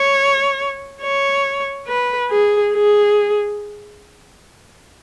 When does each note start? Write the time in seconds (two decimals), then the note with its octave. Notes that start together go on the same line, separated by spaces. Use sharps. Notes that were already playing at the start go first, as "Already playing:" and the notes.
Already playing: C#5
1.02 C#5
1.87 B4
2.30 G#4
2.73 G#4